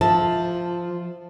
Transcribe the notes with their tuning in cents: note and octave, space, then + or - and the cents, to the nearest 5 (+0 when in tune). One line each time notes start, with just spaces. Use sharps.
F3 -5 E5 -20 A5 +0